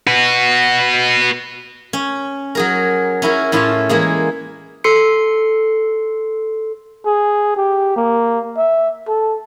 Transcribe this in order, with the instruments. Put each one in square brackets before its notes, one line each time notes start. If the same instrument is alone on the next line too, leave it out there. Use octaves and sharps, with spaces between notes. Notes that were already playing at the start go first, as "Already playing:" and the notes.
[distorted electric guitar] F#4 B4
[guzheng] C#4
F#3 G#4 A#4
C#4 E4 A#4
A2 C#4 E4 F4 F5 A5
E3 G#3 A#3 G#4
[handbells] A4 C6 C7 C#7
[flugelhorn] G#4
G4
A#3
E5
A4